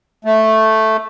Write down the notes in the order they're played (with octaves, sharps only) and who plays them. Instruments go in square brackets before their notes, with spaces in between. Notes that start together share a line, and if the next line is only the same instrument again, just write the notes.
[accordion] A3